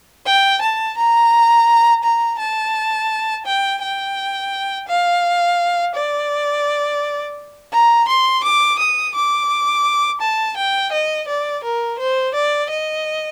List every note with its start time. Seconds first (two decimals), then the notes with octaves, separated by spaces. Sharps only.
0.26 G5
0.62 A5
0.97 A#5
2.04 A#5
2.39 A5
3.46 G5
3.82 G5
4.88 F5
5.95 D5
7.72 A#5
8.08 C6
8.43 D6
8.79 D#6
9.15 D6
10.21 A5
10.57 G5
10.92 D#5
11.28 D5
11.64 A#4
11.99 C5
12.34 D5
12.70 D#5